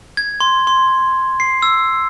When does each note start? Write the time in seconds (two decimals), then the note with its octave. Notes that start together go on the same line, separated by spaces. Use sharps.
0.17 G#6
0.40 C6
0.67 C6
1.40 C7
1.62 E6